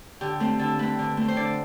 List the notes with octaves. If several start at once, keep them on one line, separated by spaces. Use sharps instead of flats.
D3 G4
A3 C4
D3 A4
A3 C4 B4
D3
A3 C4
C5
D3 D5